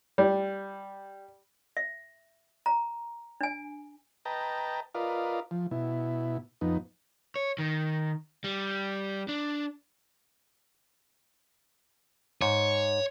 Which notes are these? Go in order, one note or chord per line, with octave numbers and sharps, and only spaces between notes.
G3
E5
A#5
D4 G#5
B4 D#5 G5 A5 A#5
F4 A#4 B4 D5 D#5 F5
F3
B2 E4
F2 B3 D#4
C#5
D#3
G3
D4
G#2 C#5